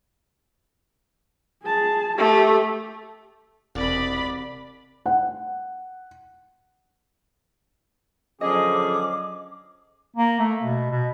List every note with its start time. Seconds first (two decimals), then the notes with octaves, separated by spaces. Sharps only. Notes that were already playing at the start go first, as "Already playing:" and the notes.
1.63 G#4 A5
2.18 A3 G4
3.75 E1 C2 D5 B5
5.06 F#5
8.41 D3 F3 F#3 C#4 G#4 D#5 D6
10.16 A#3
10.39 A3
10.63 B2
10.91 B2